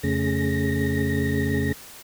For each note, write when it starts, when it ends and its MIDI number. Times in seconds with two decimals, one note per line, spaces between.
0.03 1.72 41
0.03 1.72 49
0.03 1.72 57
0.03 1.72 61
0.03 1.72 68
0.03 1.72 94